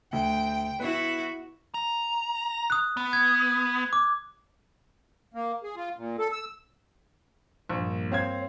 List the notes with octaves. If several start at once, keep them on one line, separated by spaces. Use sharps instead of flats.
D2 G5
B3 E4 F#4 B4
A#5
D#6 F#6
B3
G#6
D6
A#3
G#4
F4
A#2
A4
E6
A#1 G2 A#3
C4 C#5 F5 G#6